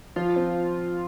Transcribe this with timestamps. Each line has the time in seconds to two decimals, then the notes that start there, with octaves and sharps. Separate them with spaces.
0.16 F3 F4
0.36 C4